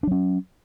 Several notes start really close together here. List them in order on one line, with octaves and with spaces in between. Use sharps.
D4 F#3 C#4